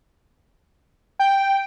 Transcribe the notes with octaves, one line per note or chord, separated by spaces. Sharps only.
G5